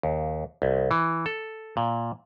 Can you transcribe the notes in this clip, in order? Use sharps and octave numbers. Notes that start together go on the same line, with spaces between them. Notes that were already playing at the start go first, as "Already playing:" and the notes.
D#2
C2
E3
A4
A#2